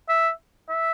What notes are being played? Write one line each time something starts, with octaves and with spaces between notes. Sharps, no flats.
E5
E5